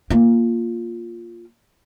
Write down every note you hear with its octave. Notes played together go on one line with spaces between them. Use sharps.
A#3 F4